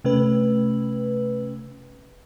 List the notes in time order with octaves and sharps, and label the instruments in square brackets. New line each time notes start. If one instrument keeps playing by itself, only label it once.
[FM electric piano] C3 A3 C#4 B4